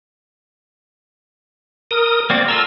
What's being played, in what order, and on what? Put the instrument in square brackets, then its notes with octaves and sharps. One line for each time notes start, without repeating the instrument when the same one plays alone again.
[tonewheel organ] A#4 D#6
[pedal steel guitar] A#3 C4 F#4 [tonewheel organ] D5
[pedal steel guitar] F4 A4 A#4 [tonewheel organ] E6